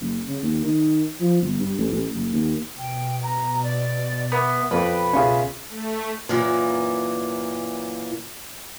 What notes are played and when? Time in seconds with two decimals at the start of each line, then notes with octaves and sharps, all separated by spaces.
0.01 F#1
0.28 C#3
0.43 D#2
0.64 D#3
1.20 F3
1.41 G1
1.59 G2
1.78 A1
1.92 A1
2.14 F#1
2.33 D#2
2.77 B2 G5
3.22 A#5
3.63 D5
4.32 B3 E5
4.71 F2 B4 G5
5.13 C#2 B2 C#4 F4 G#4 E5
5.69 A3
6.29 F#2 A#2 E3